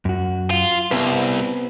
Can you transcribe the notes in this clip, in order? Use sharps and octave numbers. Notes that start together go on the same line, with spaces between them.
F#2 F#4
F4
C2 B3 C4 B4